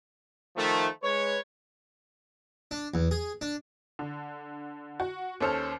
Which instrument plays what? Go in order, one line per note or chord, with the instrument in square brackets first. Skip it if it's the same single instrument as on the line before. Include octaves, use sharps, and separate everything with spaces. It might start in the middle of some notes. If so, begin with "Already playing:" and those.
[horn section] D#3 F3 A3
G#3 B4 C#5
[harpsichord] D4
E2
G#4
D4
[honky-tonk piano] D3
F#4
D#2 C#4 A4 C5 F6